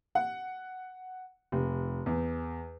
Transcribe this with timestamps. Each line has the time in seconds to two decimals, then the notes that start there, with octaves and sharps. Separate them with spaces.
0.15 F#5
1.52 F1
2.06 E2